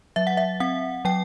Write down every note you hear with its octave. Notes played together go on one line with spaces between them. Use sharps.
F#3 E5
F#5
E5
C4 F#5
F#3 G5